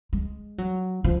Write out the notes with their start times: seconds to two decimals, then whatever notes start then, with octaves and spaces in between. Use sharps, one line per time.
0.13 G#3
0.58 F#3
1.04 F3